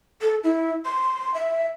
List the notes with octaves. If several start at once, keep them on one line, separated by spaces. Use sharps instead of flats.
A4
E4
C6
E5